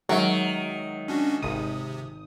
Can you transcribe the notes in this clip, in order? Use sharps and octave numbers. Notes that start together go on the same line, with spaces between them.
D#3 F#3 G#3 E5 C#6
C#4 D4 F#4
G#1 C3 D#6